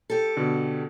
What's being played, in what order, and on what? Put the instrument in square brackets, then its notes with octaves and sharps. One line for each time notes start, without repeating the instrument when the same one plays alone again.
[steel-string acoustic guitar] G4 A4
[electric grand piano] B2 D3